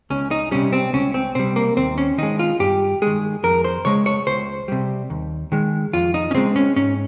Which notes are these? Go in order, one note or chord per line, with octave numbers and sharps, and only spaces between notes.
C#2 C#4
D#4
C3 G3 C#4
C4
C#2 C#4
C4
C3 G3 C4
A#3
D#2 C4
C#4
D#3 G#3 D#4
F4
G2 G4
D#3 G#3 G#4
F2 A#4
C5
C#3 G#3 C#5
C#5
C#2 C5
C3 G3
D#2
D#3 G#3
F2 F4
D#4
C#4
C#3 G#3 C4
C#4
G#2 C#4